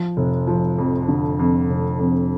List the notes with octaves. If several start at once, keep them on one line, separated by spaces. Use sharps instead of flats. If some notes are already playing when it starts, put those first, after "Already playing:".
Already playing: F3
F1
F3
F2
D3
F2
F1
F2